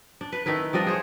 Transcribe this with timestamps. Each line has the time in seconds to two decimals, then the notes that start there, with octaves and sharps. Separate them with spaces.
0.21 D4
0.32 B4
0.46 D#3 A3 E4 B4
0.73 F3 G3 D4 D#5
0.87 G#4 C5 C#5